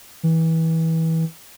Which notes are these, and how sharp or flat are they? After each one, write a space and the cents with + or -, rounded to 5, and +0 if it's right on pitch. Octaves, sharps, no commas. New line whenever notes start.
E3 -25